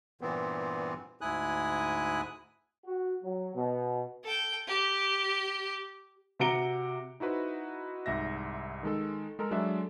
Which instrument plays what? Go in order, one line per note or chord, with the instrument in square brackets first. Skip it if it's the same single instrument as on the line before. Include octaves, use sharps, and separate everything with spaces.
[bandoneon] G2 A#2 E3 B3 C4
D2 G#2 E4 G#5 D#6 F#6
[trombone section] F#4
F#3
B2
[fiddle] A4 G5
G4
[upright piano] C3 F#4 A#5 C#7 D7 G7
[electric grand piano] D#4 E4 F#4 B4 C5
C2 G#2 E5 A#6
D#3 G#3 A4
G#3 A4 A#4
F#3 G#3 D4 A4 E5